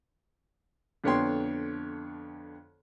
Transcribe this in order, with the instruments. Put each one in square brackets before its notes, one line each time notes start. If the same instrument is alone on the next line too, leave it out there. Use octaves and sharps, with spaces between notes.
[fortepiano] F2 D3 B3 C#5 G5 C6